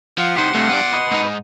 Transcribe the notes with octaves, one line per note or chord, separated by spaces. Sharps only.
F3 F4 F#5
C2 D#3 G4 C5 F#5 C6
G2 C3 A3
B3 D5
B4 D#5
G#2 D#4